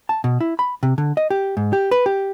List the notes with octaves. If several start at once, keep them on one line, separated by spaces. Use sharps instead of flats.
A5
B2
E4
B5
C3
D3
D#5
G4
G#2
G4
B4
G4